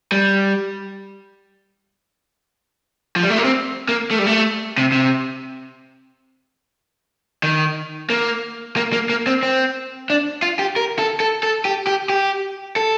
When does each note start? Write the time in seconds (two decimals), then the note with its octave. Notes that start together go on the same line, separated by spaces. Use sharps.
0.12 G3
3.16 F3
3.23 G3
3.30 A3
3.37 A#3
3.44 C4
3.89 A#3
4.11 A3
4.19 G3
4.26 A3
4.78 C3
4.92 C3
7.43 D#3
8.10 A#3
8.77 A#3
8.93 A#3
9.09 A#3
9.27 C4
9.43 C4
10.10 D4
10.42 F4
10.59 G4
10.76 A#4
10.99 A4
11.20 A4
11.43 A4
11.65 G4
11.87 G4
12.10 G4
12.76 A4